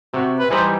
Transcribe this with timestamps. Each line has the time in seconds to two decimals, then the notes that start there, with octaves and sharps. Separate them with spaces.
0.14 C3 F#4
0.39 B4
0.51 E3 G3 D#4 G4 C5